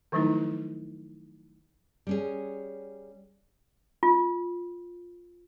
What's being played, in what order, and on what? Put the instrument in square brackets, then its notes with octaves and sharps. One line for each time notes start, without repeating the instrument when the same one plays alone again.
[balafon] D#3 F3 F#3 A3 D#4 E4
[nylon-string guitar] G3 C#4 G#4
[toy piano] F4